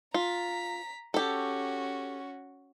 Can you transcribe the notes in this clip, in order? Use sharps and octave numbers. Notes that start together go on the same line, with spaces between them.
F4 A#5 B6
C#4 F#4 G4 A4